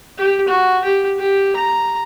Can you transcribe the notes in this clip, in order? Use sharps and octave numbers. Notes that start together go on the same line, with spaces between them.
G4
F#4
G4
G4
A#5